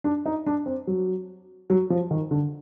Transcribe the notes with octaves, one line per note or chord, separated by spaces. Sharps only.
D4
D#4
D4
C4
F#3
F#3
F3
D#3
D3